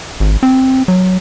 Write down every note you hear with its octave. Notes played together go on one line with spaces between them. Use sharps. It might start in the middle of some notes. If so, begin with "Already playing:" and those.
G#1
C4
F#3